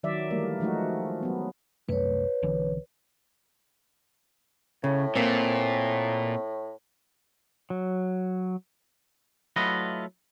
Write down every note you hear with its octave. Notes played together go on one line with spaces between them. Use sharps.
D#3 F#3 D5 E5
E3 G3 A3 A#3
F3 G#3 A3 D#4 F#4
F#3 B3
C2 F#2 A3 B4 C#5
B1 D3 E3
A2 C#3
A#2 A#3 C4
F#3
F#3 A3 E4 F4 B4 D#5